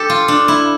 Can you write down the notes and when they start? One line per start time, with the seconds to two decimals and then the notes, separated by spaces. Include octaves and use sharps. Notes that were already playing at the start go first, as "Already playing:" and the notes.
Already playing: G4 A4
0.10 F4
0.28 D4
0.48 E4